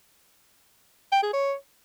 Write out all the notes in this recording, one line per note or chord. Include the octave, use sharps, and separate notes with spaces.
G5
G#4
C#5